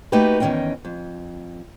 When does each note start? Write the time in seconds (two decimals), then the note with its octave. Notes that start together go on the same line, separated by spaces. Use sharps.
0.12 A3 A#3 D#4 F#4 G4 B4
0.40 E2 D#3 G#3 C#4 D#5 G5
0.85 F2